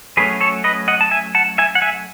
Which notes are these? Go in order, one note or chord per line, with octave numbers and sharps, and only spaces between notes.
F#3 A3 C#4 G#4 B4
A4 C#5
B4 D#5
D#5 F#5
A5
E5 G#5
F#5 A5
E5 G#5
F#5
E5 G#5